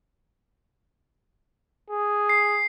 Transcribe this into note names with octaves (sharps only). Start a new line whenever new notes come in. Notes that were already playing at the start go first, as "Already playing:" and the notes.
G#4
C7